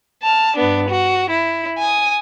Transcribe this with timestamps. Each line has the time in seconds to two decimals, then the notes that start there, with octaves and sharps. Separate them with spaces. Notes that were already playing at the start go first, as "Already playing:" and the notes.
0.23 A5 F6
0.57 G2 B3 D4
0.88 F#4
1.31 E4
1.79 G#5 D#6